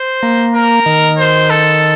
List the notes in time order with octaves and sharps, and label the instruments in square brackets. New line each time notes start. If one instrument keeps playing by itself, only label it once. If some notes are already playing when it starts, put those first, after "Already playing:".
Already playing: [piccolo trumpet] C5
[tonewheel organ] A#3
[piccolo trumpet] A#4
[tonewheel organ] D#3
[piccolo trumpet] C5
A4